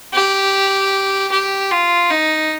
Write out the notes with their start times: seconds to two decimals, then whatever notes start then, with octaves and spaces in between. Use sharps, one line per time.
0.13 G4
1.31 G4
1.71 F4
2.10 D#4